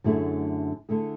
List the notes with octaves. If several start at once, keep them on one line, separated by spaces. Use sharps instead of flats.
F#2 D3 A3 E4 G#4
D3 A3 E4 G#4